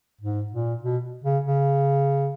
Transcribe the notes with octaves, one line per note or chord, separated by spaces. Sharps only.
G#2
A#2
B2
C#3
C#3